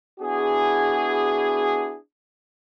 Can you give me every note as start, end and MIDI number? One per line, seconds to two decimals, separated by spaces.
0.21 1.98 59
0.21 1.98 62
0.21 1.98 64
0.21 1.98 66
0.21 1.98 68